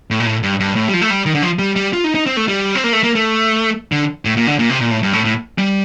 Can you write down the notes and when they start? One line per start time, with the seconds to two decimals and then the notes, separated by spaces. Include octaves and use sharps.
0.10 A2
0.20 A#2
0.26 A2
0.43 G2
0.60 G2
0.76 A2
0.88 G3
0.94 F3
1.02 A3
1.10 G3
1.26 D#3
1.35 D3
1.42 F3
1.59 G3
1.76 G3
1.93 F4
2.04 D#4
2.15 D#4
2.26 C4
2.37 A3
2.48 G3
2.75 C4
2.84 A#3
2.93 A3
3.03 A#3
3.15 A3
3.92 D3
4.25 A2
4.37 A#2
4.47 D3
4.59 A#2
4.70 C3
4.81 A#2
4.91 A2
5.03 G2
5.13 A2
5.25 A2
5.58 G3